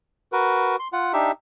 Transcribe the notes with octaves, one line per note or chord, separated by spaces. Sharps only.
F#4 A#4 B4
C6
F4 F#5
D4 D#4 G4 E5